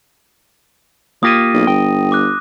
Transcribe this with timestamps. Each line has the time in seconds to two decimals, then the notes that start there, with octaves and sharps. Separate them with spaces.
1.23 A#3 F4 G4 D#6 A#6 D#7
1.54 B1
1.67 G1 G5
2.12 D6 F#6